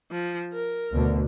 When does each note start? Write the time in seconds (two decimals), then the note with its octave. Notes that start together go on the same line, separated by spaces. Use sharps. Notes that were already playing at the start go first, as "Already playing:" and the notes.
0.11 F3
0.53 A#4
0.91 D2 B2 D3